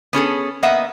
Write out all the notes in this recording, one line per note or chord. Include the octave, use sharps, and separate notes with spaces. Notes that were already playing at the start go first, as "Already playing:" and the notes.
B3 C#4 G#4 A4
A#3 B3 D#5 E5 F#5